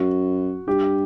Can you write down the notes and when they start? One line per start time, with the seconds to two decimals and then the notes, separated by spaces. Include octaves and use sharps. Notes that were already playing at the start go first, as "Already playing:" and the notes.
Already playing: F#2 F#4
0.67 G2 G4